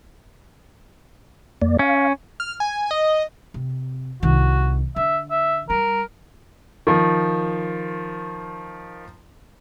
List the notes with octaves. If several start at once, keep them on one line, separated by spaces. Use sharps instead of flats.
F2 A#3 D5
C#4 F5
F6
G#5
D#5
C3
C2 D#3 F#4
D3 E5
E5
G3 A#4
D#3 F3